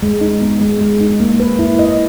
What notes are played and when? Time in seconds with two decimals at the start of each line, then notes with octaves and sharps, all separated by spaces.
0.03 G#3
0.21 D#4
0.41 B3
0.61 G#3
0.81 G#3
1.01 D#4
1.20 A#3
1.40 B4
1.59 E4
1.79 D#5